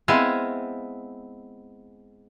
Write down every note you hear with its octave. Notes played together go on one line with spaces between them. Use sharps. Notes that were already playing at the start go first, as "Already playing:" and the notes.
G#3 B3 C4 E4 F5 G#5